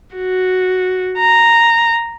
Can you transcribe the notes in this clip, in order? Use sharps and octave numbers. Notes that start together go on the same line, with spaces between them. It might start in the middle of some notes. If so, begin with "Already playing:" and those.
F#4
A#5